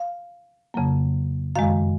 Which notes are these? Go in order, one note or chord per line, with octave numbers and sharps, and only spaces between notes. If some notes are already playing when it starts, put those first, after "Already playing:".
Already playing: F5
F2 C#3 F#3 A#3
F#2 D#3 G#3 F5